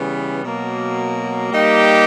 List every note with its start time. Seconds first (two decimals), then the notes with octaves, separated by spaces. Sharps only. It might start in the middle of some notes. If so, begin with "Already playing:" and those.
Already playing: C#3 E3 G3 B3
0.43 B2 F#3 A#3
1.52 G3 A#3 D#4 G4